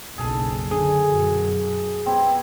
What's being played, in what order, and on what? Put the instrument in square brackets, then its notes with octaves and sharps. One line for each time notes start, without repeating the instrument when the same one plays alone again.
[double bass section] F#1 B1 F#2 [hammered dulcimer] G#4 A4
[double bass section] D3 [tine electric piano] G#4 [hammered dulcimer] G#5
[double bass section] F#2 B2 F#3
[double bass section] B3 [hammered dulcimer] C4 E4 G4 [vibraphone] G5